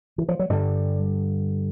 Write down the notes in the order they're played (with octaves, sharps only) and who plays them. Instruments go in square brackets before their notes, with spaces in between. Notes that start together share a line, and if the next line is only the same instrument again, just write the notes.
[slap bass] E3
F3
F#3
G2 D3 G3